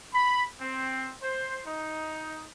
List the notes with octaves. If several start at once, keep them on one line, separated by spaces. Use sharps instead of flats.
B5
C4
C5
D#4